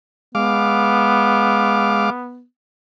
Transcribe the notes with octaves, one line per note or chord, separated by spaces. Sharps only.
G#3 B3 F5 D6